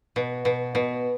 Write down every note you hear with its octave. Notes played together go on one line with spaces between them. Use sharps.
B2
B2
B2